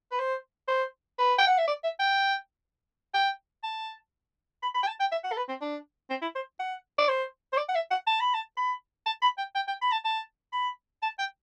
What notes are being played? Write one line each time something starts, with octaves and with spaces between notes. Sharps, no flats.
B4
C5
C5
B4
G5
F#5
E5
D5
E5
G5
G5
A5
B5
B5
G5
A5
G5
E5
F#5
A4
B4
C4
D4
C4
E4
C5
F#5
D5
C5
C5
D5
F#5
E5
F#5
A5
B5
A5
B5
A5
B5
G5
G5
G5
B5
A5
A5
B5
A5
G5